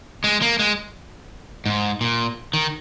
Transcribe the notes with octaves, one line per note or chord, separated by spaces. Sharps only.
G#3
A#3
G#3
G#2
A#2
D#3